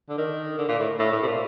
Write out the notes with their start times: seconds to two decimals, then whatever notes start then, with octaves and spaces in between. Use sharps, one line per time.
0.09 D3
0.18 D#3
0.58 D3
0.68 A#2
0.79 A2
0.99 A2
1.12 A2
1.22 C3
1.27 A#2